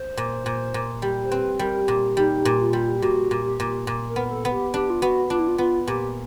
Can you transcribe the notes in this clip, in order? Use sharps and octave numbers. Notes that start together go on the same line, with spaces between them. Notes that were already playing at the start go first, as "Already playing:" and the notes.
Already playing: C5
A#2
A#2
A#2
G3
C5
C4 B4
G3 A#4
A#2
G3 D#4
A#2
F4
G3
G4
A#2 F#4
A#2
G4
A#2
A#2
A#4
B3
A4
B3
G4
D4 G4
F4
B3 F#4
D4 F4
E4
F4
B3 F4
A#2 G4